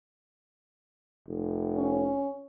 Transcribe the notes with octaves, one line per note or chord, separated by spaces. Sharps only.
F1
C#4